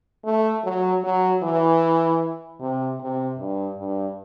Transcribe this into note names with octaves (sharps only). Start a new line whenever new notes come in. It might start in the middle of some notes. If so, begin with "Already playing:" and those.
A3
F#3
F#3
E3
C3
C3
G2
G2